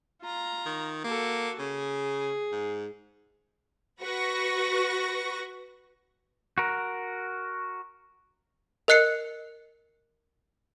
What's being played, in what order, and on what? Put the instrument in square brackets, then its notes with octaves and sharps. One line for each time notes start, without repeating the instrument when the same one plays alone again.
[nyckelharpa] F4 A#5
[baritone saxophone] D#3
[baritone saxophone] A#3 [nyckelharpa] F#4 A4
[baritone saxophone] C#3 [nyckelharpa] G#4
[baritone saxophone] G#2
[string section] F#4 B4 C#6 A#6
[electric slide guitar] F#4 A#4
[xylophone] A#4 D#5 F#6 C7 C#7